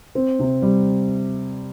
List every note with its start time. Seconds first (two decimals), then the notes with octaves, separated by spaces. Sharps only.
0.15 C4
0.39 C3
0.62 G3